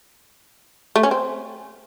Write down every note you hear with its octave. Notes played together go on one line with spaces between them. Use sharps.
A3
C#4
C4